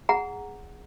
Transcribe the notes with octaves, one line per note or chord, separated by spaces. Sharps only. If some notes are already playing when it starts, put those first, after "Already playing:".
G#4 F#5 A#5